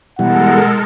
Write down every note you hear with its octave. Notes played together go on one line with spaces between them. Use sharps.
B2 E3 G3 G#3 A4 A#4 F#5